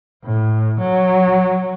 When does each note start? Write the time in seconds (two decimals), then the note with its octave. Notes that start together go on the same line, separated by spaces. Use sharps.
0.24 A2
0.80 F#3